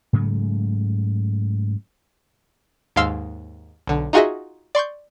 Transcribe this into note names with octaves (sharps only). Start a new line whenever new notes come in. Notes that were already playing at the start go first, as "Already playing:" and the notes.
G#2 C#3 F#3 A3
D#2 G#2 F5 C6 E6 F6
B1 D3
D#4 F4 F#4 G#4 D#5 E5
D5 C6 C#6 G6